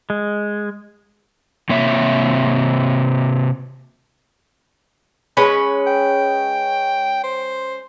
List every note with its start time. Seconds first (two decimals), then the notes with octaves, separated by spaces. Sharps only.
0.10 G#3
1.69 C3 A#3 C#5 E5
5.37 G#3 C#4 B4
5.87 G5
7.24 C5